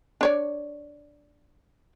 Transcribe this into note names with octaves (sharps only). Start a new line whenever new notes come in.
D4 C#5 D5